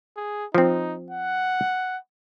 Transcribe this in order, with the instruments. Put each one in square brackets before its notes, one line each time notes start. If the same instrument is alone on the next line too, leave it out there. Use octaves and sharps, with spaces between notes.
[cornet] G#4
[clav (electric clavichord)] F3 C4 [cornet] D#4
[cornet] F#5